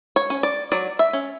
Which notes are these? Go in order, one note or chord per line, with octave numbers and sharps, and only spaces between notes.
C#5
C#4
D5
F#3 D5
E5
C#4